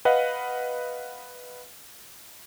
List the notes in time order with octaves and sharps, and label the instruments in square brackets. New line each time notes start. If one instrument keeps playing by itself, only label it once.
[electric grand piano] B4 D#5 F5 F#5